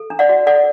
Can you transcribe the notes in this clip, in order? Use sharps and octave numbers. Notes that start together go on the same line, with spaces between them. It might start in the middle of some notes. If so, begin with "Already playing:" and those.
Already playing: A4
D4
D5 F#5
F#4
A4 D5 F#5